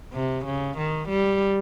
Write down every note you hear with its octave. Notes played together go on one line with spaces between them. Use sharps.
C3
C#3
D#3
G3